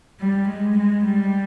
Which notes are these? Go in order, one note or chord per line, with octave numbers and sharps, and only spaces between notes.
G3
G#3
G#3
G3